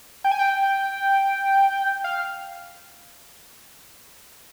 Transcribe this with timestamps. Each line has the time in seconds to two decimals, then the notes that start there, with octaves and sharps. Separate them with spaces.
0.24 G5
0.31 G#5
0.39 G5
2.04 F5